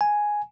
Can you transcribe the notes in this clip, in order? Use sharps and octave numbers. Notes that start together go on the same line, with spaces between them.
G#5